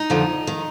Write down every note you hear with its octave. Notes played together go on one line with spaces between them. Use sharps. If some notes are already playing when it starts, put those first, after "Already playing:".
Already playing: D#4
F2 D3 F3
D#3